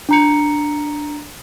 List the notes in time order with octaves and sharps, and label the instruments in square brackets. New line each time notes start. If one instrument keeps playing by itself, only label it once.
[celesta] D4 A#5 C#7